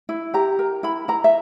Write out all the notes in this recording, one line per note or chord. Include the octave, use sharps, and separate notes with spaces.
E4
G4 A#5
A#4
E4 B5
E4 A#5
E5